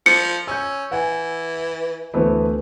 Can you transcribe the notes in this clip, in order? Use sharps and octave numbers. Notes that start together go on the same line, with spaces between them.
F3 C#7
C#4 E6 G6
E3 F#5 G#5
D2 E3 A3 B3 C5